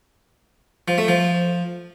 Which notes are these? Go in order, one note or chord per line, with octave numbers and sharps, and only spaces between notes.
F3
A3
F3